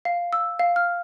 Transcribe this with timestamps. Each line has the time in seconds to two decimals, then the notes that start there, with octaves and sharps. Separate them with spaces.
0.05 F5
0.33 E6
0.59 F5
0.76 F6